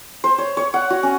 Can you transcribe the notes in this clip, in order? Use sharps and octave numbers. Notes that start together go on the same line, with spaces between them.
C5
C#5
C#5
F#5
F#4
C#4